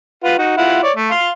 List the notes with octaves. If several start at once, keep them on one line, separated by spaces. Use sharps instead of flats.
F4 B4 F#5
D#4 F#4
E4 F4 F#5
C#5 D5
A3
F5 C6